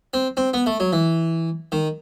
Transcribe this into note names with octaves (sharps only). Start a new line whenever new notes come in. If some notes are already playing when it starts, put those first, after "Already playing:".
C4
C4
B3
A3
F#3
E3
D#3